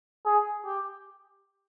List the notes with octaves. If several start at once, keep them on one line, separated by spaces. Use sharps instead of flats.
G#4
G4